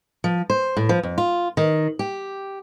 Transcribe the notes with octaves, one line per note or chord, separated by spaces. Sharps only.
F3
C5
A2
F3
F2
F4
D#3
G4